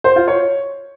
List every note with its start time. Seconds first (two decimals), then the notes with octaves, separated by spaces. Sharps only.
0.04 C5
0.16 F4
0.28 C#5